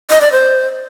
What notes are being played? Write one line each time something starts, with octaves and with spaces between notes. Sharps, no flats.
D#5
D5
C5